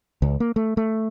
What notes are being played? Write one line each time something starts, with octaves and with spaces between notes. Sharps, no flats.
C#2
A#3
A3
A3